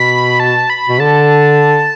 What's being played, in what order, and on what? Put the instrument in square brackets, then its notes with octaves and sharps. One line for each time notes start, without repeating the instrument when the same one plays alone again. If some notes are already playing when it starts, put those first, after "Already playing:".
Already playing: [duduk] B2 [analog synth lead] B5
[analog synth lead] A5
B5
[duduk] B2
[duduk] D3 [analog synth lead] A5